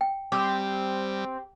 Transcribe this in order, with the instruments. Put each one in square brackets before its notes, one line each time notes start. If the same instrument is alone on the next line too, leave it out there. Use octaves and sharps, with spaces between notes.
[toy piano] G5
[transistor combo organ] G3 [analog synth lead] C4 [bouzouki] G4 [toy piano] D6